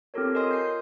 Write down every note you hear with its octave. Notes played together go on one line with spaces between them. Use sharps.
C4 F4 G4 A4 A#4 C#5
F4 A#4 D#5 G#5 C6 D#6
G6 C7